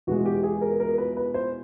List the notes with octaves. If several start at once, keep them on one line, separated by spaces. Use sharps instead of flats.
E2 B2 G#3 F#4
G4
G#4
A#4
A#4
B4
B4
C5